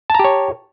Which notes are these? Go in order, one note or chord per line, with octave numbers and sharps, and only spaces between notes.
G4 C#5 A5 A#5